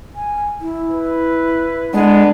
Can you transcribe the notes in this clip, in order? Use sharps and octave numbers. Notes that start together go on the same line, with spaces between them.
G#5
E4
B4
D3 G#3 B3 D4